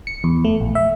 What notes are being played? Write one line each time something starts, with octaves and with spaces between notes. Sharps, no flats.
C#7
E2
A3
A#1
E5